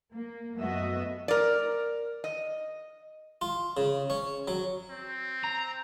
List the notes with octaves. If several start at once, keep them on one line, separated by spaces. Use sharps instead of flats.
A#3
F#2 A3 B3 F#4 D#5 E5
A#4 D5
D#5
F4
C#3
C#4
F#3
C4
A#5